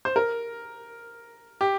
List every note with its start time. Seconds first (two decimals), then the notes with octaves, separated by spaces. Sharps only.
0.05 C5
0.16 A#4
1.61 G4